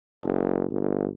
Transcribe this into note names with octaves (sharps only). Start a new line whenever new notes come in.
F#1
G1